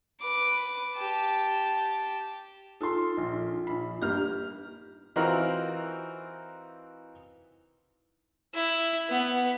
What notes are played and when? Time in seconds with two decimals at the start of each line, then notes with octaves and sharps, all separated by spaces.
0.21 B4 D6
0.95 G4 A5
2.81 D#4 F4 A4 C6
3.17 A#1
3.67 A#1 B5
4.02 G1 A#3 G4 F6
5.16 E3 C4 D#4 F4 F#4 A#4
8.54 E4
9.09 B3